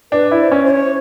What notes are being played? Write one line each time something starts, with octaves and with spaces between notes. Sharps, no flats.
D4 B4
E4
C5
C#4
C5
C#5